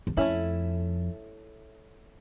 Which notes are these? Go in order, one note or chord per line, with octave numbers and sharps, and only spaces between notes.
E2
F2 A3 C#4 E4